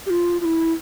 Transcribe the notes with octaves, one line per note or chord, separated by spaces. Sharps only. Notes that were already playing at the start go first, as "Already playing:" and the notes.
G4
F4
F4
E4